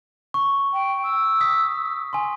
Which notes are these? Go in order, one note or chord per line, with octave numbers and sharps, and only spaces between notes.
C#6
G5
E6
D#6 B6
G#5 C6